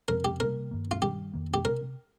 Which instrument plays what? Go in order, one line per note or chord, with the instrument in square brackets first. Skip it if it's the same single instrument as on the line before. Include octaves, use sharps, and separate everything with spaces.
[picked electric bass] F2 C3 F3 C4 [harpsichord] A#4
[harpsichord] G4
[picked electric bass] C3 G3 A#3 [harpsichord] A#4
[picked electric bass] G2 D#3 A#3
[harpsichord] F4
[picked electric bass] G2 D#3 G3 [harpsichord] G4
[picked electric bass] F2 D#3 A#3
[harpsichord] G4
[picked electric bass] C3 [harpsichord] A#4